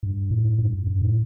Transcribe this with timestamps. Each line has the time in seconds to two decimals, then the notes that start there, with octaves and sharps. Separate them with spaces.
0.03 G2
0.31 A2
0.59 G2
0.73 F#2
0.87 F#2
1.01 A2